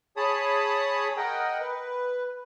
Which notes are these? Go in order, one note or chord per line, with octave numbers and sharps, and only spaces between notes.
G#4 C#5 A5 B5 D#6
A#4 D#5 F#5 G5
B4